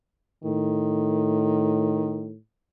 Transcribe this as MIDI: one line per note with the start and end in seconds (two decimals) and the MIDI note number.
0.44 2.37 45
0.44 2.32 51